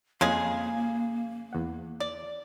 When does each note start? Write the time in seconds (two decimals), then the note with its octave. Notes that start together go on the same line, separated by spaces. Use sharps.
0.21 F2 C#3 G#3 A#3 G#4
1.53 E2 F#5
2.00 D5